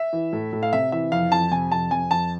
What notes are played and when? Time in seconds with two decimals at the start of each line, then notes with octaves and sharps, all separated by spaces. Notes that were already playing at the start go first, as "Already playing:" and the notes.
Already playing: E5
0.13 E3
0.33 A2
0.53 A2
0.63 F5
0.73 C3 E5
0.92 E3 E5
1.12 F2 F5
1.31 F2 A5
1.52 C3 G#5
1.72 F2 A5
1.91 F2 G#5
2.11 F2 A5